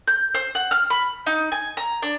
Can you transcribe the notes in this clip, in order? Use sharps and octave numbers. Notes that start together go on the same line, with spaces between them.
G6
C5
F#5
F6
B5
D#4
G#5
A#5
D4